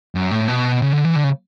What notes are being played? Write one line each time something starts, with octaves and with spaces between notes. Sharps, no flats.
F#2
A2
B2
C#3
D3
E3
D3
C#3